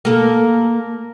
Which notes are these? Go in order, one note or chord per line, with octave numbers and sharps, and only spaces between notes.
A#3 A4